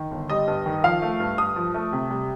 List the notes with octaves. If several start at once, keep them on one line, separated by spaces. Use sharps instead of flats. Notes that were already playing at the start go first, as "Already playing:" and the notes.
Already playing: D#3
G1
G3 D#5
G2
D#3
F3 F5
A3
G2
G2 D#6
F3
A3
C3
G3